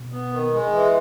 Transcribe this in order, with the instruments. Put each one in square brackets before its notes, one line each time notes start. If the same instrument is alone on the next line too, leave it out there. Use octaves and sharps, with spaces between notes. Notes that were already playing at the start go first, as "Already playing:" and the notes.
Already playing: [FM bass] B2
[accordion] B3
D#3
G#3
E3